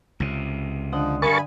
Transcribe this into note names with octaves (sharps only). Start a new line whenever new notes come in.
C#2 C3
D3 F3 D#5 F#5
G2 A#4 G#5 A5 B5 C#6